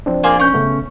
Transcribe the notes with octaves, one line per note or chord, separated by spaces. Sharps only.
F3 C4 D4
A#3 F4 G#4
C#4 G6
C#3 A3 B3